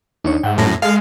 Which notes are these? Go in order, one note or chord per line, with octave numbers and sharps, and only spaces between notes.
D#2 D4 D#4 C#5
G#2 E5 F#5 G5
F#2 A2 A4 A#6
G#3 A4 F5